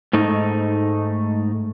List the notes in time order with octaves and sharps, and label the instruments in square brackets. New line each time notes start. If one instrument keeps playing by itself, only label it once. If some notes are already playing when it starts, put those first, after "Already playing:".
[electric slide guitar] G#2 A3 D#4